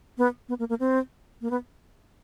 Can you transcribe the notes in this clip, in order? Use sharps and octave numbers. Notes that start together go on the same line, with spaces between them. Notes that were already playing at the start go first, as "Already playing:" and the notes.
B3
B3
A#3
A#3
C4
A#3
B3